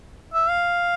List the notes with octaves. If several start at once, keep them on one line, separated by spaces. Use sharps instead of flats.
E5
F5